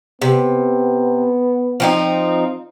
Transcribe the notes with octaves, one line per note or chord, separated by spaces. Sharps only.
C3 B3
F3 C4 D#4